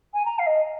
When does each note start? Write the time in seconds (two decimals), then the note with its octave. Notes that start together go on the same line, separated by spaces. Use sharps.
0.13 G#5
0.25 A#5
0.38 F5
0.46 D#5